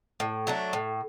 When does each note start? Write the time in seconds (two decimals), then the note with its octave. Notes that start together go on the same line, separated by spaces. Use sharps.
0.20 A2
0.47 F#3 A3 D4
0.73 A2